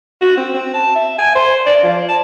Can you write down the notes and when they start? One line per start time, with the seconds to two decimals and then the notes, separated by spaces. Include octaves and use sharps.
0.21 F#4
0.37 C4
0.54 C4
0.74 A5
0.95 E5
1.18 G#5
1.35 C5
1.66 D5
1.83 F3
2.08 A5